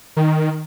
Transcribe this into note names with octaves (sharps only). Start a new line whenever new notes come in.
D#3